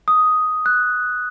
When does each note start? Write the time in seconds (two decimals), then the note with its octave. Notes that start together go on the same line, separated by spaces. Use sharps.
0.08 D#6
0.66 F#6